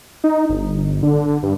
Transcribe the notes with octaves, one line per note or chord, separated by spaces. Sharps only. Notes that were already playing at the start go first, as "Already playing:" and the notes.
D#4
G1
D3
G2